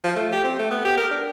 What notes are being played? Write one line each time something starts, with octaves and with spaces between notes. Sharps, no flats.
F3
A3
G4
C4
A3
B3
G4
A#4
D4